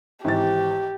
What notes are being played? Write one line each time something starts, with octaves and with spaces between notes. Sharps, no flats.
G#1 E3 G4 A6